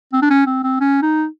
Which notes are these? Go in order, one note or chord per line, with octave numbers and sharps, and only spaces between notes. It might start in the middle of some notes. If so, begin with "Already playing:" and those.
C4
D4
C#4
C4
C4
C#4
D#4